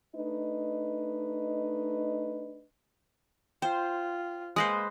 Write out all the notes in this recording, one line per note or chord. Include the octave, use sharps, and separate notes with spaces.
A3 D4 D#4 B4 D#5
F4 C5 G5
G#3 A#3 B4 C5 D#6 A#6 C7